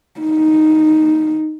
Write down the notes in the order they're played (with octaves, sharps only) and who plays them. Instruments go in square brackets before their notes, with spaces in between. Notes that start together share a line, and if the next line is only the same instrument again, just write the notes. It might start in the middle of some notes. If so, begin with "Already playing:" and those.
[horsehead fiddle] D#4